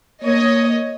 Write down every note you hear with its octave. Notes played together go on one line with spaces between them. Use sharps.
A#3 C#5 D#5